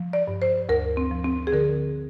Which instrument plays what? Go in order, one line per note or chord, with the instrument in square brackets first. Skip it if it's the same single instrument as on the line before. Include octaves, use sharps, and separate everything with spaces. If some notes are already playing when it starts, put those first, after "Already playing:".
Already playing: [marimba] F3
D5
G2
C5
D2 A#4
C4
F3
C4
G#4
D3 A#4